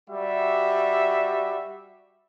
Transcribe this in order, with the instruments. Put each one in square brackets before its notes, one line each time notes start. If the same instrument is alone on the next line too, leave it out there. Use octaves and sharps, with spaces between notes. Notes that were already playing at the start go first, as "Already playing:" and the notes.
[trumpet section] G3 F#4 E5